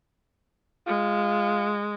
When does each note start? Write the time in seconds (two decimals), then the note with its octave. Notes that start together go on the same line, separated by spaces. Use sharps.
0.87 G#3 F4